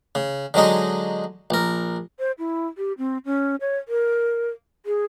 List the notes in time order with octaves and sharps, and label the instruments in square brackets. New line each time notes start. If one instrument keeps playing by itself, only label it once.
[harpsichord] C#3
D3 F#3 G#3 D#4
A#1 A#4
[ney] C5
E4
G4
C4
C#4
C#5
A#4
G#4